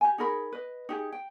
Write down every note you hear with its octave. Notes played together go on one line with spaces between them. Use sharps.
G4 G#5
D#4 G#4 A#4 B5
B4 D#5
D#4 G4 G#4
G5